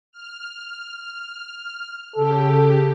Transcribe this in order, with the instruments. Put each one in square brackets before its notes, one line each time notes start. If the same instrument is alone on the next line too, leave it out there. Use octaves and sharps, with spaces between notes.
[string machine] F6
[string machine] C#3 G4 [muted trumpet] A4